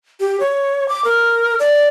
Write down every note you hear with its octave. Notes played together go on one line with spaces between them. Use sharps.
G4
C#5
D6
A#4
D5